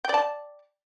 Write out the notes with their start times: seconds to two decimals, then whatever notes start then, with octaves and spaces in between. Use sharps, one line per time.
0.05 G5
0.09 D5
0.14 A5